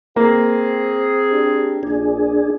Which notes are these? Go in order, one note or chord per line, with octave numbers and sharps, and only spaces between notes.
A#3 C4 G#4
D4 G4
A#1 D4 G#4